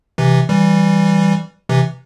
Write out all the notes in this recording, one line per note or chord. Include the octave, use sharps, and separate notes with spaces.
C3 E3
E3 G3
C3 E3